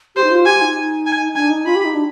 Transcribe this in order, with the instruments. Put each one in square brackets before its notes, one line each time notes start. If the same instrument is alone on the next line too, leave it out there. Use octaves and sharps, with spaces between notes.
[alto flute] G4 [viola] C5
[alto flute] D#4
F4
[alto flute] G4 [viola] G#5
[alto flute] D#4
[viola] G#5
[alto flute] D4 [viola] G#5
[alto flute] D#4
[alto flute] F4 [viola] B5
[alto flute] G4
D#4
D4